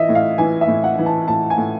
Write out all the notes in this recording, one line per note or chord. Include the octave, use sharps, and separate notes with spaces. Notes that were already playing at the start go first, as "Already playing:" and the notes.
Already playing: E3 D#5 E5
A2
F5
E3 G#5
E5
A2
F#5
E3
A5
A2 A5
G#5
A2